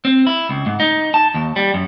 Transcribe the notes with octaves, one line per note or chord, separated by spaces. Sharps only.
C4
E4
C#2
G#2
D#4
A5
D#2
G3
F#2